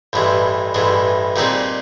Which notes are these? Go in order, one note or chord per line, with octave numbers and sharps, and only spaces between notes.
A1 G2 E3 G#3
A1 G2 E3 G#3
A#2 G3 C4 D#4 G#4